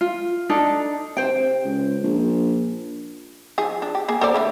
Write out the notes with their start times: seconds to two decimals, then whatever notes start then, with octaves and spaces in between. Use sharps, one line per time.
0.01 F4
0.49 D4 D#4 A4
1.17 C3 C5 G5
1.64 C#2
2.04 A#1
3.58 F3 D#4 G#4
3.82 D4
3.95 G4
4.08 A#3 G#4
4.21 A4 C5 D5
4.34 D3 A3 E4